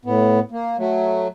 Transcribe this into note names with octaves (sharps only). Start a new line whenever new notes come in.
A2 B3
A#3
F#3 A3